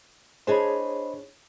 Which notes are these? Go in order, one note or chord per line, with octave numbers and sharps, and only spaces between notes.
D4 G#4 C5 C#5 D#5 B5